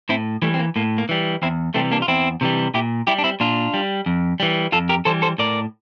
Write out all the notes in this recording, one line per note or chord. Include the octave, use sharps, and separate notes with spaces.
A2 C4 E4
E3 G3 A3
C4
A#3
A2 A#3
A#3
E3 G3
E2 C4 E4
C3 E3 G3 A3 C4
A#3 D4
F4
E2 C4 E4
C3 E3 G3
A#2 E4 G4
G3 E4 G4
D4
C4 E4
A#2 D4 F4
G3
F2
E3 G3
F2 F4 A4
G4 A#4
E3 G3 A4 C5
A4 C5
A2 A#4 D5